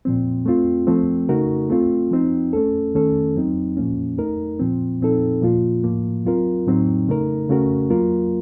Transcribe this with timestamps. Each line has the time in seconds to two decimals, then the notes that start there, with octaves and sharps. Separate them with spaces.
0.05 A#2 F3 C4
0.46 A3 C4 F4
0.87 F3 A3 C4
1.29 C#3 A3 D#4 F#4 A#4
1.70 A3 C4 F4
2.11 F3 C4 D#4
2.53 A3 C#4 A4
2.94 D#3 A3 C#4 A4
3.36 F#3 C4 D#4
3.77 A#2 F3 A#3 C#4
4.18 A3 D#4 A#4
4.60 A#2 F3 C4
5.01 A#2 F3 C4 D#4 A4
5.42 A#2 F3 A#3 F4
5.84 A2 F3 A#3
6.25 F#3 C4 F4 A#4
6.66 A2 F#3 C4 D#4
7.08 C#3 A3 D#4 A#4
7.49 C#3 A3 C#4 F#4 A#4
7.90 F#3 A#3 F4 A#4